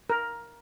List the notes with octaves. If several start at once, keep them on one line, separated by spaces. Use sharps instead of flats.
A#4